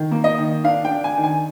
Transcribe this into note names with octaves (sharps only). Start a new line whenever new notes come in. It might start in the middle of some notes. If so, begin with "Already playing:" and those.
Already playing: D#3
A#3
D#5
D#3
D4 F5
G5
D4
G#5
D#3
G#5